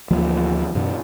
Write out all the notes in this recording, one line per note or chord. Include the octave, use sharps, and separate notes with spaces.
D2 E3 F3 A#3
F#2 B2 E3